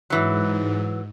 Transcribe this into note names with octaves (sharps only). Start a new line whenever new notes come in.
G#2 E3 F#3